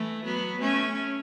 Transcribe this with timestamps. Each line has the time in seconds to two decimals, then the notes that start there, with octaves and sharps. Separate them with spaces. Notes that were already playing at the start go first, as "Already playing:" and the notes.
Already playing: E3 A3
0.24 F#3 B3
0.60 A3 C#4